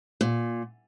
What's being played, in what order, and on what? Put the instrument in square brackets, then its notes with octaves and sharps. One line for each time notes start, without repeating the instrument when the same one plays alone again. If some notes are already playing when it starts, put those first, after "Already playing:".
[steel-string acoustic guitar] A#2